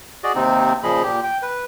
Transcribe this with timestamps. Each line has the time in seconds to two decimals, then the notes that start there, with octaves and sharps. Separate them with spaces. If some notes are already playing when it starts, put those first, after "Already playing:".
0.24 F#4 G#4 D5 D#5
0.35 D#2 C3 C4 D#4
0.83 A#2 C#3 F3 G#4 D#5 B5
1.03 A#2 G4
1.23 G5
1.42 B4